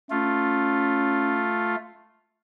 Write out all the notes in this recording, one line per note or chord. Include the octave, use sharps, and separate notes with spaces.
A3 C#4 F4